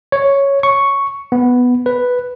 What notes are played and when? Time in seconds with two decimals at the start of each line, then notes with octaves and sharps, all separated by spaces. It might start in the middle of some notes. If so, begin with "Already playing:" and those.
0.12 C#5
0.63 C#6
1.32 B3
1.86 B4